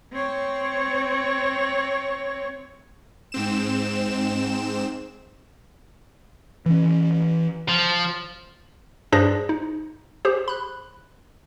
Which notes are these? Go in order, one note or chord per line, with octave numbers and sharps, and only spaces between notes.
C4 C#5
G#2 C4 E7
E3 C#4
F3
G2 D4 G#4 C5 D5 A#6
D#4
G4 G#4 C5
B5 F#6